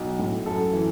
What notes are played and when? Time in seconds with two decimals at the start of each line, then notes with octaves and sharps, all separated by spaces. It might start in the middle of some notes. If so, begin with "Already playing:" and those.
Already playing: B1
0.19 A2
0.46 F#2 A4
0.73 E3